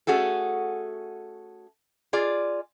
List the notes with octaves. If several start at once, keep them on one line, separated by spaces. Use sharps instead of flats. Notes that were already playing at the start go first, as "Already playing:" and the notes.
A3 C#4 F#4 G#4 A4
F4 G#4 D5